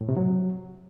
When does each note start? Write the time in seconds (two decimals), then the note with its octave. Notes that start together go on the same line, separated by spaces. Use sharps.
0.01 A2
0.09 C3
0.17 F#3